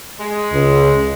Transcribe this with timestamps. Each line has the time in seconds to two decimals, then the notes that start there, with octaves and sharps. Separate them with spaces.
0.20 G#3
0.52 C#2